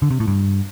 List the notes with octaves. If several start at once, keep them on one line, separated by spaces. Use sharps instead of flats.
D3
C3
A2
G2